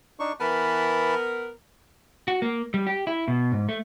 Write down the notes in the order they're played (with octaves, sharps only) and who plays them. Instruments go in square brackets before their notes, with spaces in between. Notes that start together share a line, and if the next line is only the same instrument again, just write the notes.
[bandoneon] D4 D#4 C#6
[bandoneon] E3 A5 B5 [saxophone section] B3 A#4
[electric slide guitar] F#4
A#3
G3
G4
E4
B2
G#2
A3